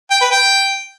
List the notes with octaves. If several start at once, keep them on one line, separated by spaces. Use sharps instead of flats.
G5
B4
G5